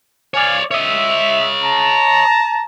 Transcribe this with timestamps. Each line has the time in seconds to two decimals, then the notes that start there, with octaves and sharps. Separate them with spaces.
0.34 C#5 D5 F5 G#5
0.71 C#5 D#5 E5
1.64 A5 A#5